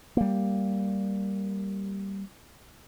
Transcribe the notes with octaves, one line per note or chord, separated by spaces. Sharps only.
G3 A#3